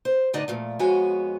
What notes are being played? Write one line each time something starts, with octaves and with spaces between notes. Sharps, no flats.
C5
A2 D3 D#4 D5 D#5
A#2 F3 A3
F2 G#3 B3 F#4 C#5 G#5